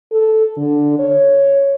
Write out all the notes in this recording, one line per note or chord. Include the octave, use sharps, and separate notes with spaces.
A4
D3
C#5